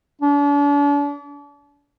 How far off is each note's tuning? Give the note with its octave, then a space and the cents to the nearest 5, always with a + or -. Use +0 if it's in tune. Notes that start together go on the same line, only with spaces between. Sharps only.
D4 -40